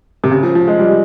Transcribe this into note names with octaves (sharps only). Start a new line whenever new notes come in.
C3
C#3
F3
F3
G#3
G3